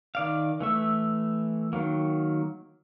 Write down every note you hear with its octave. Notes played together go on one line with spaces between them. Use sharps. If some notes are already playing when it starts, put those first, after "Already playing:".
D#3 D5 F5
E3 A3 E5
D#3 F#3 A#3